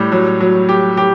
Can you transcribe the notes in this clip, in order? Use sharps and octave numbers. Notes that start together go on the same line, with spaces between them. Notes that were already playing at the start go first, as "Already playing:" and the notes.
Already playing: A2 G3
F#3
F#3
G4
G4